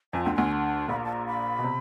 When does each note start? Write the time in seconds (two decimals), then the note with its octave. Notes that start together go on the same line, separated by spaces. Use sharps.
0.13 F2 F3 G#5
0.24 D2 D3 G5
0.35 D2 D3 G#5
0.51 A5
0.88 A#1 A#2 B5
0.96 A#5
1.05 A5
1.13 A#5
1.27 B5
1.59 B2
1.64 C3